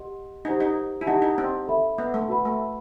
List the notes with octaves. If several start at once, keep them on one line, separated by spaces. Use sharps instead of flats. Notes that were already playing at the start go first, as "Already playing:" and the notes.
Already playing: G4 D#5 F#5 C6
D#4 G4 C5 F#5
D#4
E4
D#4 G4 D#5 F#5 A5
D#4
C4
A4 E5 B5
B3
A3
F#4 B4 F#5 B5
A3